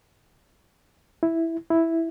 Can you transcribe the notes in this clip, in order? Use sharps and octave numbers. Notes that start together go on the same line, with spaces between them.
E4
E4